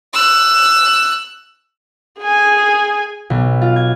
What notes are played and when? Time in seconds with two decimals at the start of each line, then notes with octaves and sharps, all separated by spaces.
0.13 E6 F#6
2.20 G#4 G#5
3.30 B1
3.61 F4
3.76 G#6